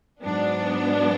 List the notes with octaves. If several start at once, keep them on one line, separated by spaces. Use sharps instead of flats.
G#2 F#3 B3 D4